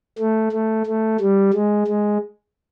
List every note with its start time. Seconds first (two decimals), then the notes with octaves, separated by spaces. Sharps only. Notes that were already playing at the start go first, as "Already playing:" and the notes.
0.18 A3
0.52 A3
0.86 A3
1.21 G3
1.54 G#3
1.87 G#3